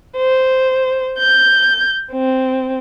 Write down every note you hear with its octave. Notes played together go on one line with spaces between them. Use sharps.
C5
G6
C4